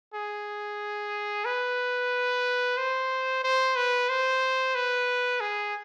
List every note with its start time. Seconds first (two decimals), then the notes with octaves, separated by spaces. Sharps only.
0.14 G#4
1.45 B4
2.77 C5
3.44 C5
3.76 B4
4.09 C5
4.75 B4
5.40 G#4